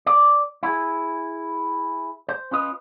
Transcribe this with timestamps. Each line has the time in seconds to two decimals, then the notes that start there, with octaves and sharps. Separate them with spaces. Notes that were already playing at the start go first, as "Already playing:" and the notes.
0.06 D5
0.63 E4 G#4
2.28 C5
2.51 C#4 F4 B4 D#5